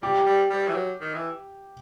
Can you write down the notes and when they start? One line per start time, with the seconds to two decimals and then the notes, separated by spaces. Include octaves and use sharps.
0.02 G3 G4
0.26 G3
0.50 G3
0.68 E3
0.74 F#3
1.01 D#3
1.14 E3